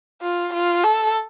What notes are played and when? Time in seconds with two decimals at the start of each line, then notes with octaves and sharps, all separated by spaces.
0.22 F4
0.53 F4
0.84 A4